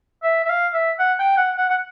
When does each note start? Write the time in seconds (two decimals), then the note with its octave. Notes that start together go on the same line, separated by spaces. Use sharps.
0.23 E5
0.45 E5
0.50 F5
0.74 E5
0.99 F#5
1.19 G5
1.37 F#5
1.57 F#5
1.70 F#5